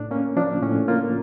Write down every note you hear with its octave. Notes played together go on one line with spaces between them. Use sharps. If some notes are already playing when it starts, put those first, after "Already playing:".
Already playing: A2 D4
A#3 C#4
F3 D4
A2 C#4
A#3 F4